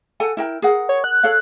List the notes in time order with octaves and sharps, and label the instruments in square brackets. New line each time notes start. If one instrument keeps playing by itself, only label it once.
[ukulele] A4 F#5 G#5
E4 A#4 G5
G#4 A#4 F#5
[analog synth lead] C#5
F#6
[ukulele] A4 C#5 F5